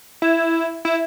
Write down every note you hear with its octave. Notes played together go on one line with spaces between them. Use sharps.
E4
E4